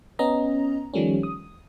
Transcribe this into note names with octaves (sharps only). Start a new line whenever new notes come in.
B3 C#4 D#5 A#5
D#3 F3 G3 A3 C#4
D#6